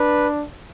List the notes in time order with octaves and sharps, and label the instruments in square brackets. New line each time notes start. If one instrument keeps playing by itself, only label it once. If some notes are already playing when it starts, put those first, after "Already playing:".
Already playing: [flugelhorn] D4 [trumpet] B4